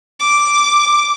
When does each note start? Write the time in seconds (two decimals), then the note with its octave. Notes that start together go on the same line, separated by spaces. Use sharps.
0.20 D6